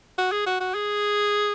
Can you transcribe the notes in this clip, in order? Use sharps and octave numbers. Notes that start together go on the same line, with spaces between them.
F#4
G#4
F#4
F#4
G#4